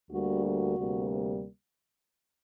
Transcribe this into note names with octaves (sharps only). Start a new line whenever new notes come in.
D2 D3 G3 A#3 F#4
F#4
D2 C3 G3 A#3